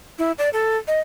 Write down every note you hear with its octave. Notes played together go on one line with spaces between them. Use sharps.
E4
D5
A4
D#5